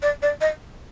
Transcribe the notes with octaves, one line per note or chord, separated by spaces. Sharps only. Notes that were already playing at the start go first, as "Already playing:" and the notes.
D5
D5
D#5